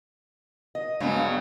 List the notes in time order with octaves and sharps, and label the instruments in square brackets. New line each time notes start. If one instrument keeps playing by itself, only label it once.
[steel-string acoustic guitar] D#5
[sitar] G2 C#3 F#3 [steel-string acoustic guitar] G#3 B3